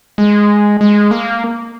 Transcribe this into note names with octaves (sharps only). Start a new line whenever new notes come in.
G#3
G#3
A#3